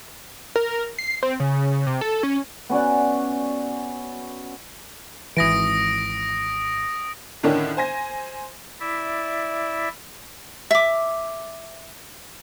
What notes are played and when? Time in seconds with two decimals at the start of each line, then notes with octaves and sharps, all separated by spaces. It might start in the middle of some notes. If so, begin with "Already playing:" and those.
0.56 A#4
0.99 C7
1.23 C4
1.40 C#3
1.87 C3
2.01 A4
2.23 C#4
2.70 B3 C#4 F#4 D5
5.37 G#1 E3 D#6 A#6 D7
7.43 A2 D3 D#3 C#4 D4
7.77 C5 G#5 A#6
8.80 E4 D5 E5
10.71 E5 D6